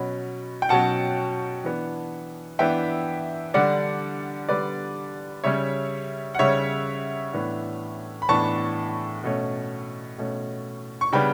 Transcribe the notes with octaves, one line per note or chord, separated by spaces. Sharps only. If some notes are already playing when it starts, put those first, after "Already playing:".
Already playing: B2 F#3 C#4 B5
G5
B2 F#3 C#4 F#5 A5
E3 B3 D4
E3 B3 D4 E5 G5
D3 G3 D4 D5 F#5
D3 G3 D4 B4 D5
C#3 G3 C#4 C#5 E5
F#5
C#3 G3 C#4 C#5 E5
A2 E3 B3 D4
B5
A2 E3 B3 D4 A5 C#6
B2 A3 C#4
B2 A3 C#4
C#6
C#3 G3 B3 D4 G5 B5